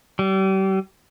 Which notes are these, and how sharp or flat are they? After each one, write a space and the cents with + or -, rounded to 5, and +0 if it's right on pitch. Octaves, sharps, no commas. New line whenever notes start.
G3 -35